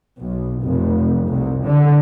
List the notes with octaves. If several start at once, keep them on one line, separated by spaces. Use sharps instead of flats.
B1
F1
C2
D3